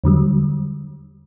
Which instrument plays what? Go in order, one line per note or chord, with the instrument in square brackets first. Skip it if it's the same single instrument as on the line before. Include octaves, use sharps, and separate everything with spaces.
[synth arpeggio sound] E2 D3 F#3 G3